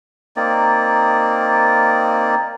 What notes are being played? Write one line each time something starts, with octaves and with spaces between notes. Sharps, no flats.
A#3 C4 D#4 D5